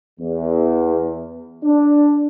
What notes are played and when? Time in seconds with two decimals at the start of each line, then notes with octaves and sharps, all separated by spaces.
0.19 E2
1.63 D4